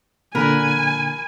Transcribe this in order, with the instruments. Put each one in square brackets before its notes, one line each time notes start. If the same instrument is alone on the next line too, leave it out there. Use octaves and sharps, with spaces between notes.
[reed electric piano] A#2 D3 [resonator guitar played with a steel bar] A#4 [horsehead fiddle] G#5 [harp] B5 F#6